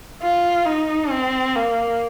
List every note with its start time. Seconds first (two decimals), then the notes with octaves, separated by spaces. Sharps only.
0.22 F4
0.66 D#4
1.11 C4
1.55 A#3